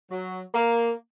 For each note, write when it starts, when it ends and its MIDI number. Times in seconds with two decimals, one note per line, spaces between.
0.11 0.40 54
0.54 0.89 58